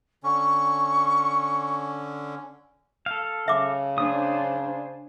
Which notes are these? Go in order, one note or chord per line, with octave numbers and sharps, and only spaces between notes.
D3 C#4 C#6
A4 F5
C#3 E5 D6
D4 C5 G#5 D#6